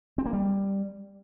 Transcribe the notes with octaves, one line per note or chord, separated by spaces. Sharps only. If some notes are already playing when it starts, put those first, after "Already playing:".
C4
A#3
G3